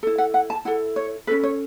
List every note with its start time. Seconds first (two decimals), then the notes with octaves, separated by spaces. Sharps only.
0.03 E4 A4
0.18 F#5
0.34 F#5
0.50 A5
0.65 E4 A4 F#5
0.96 C#5
1.27 C#4 F#4 A4 B4
1.43 C#5